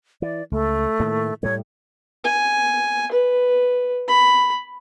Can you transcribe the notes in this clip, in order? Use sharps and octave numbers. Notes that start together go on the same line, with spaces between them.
E3 D5
C#2 A3
A2 D#3 A#3
A2 G3 A3 C#5
G#5
B4
B5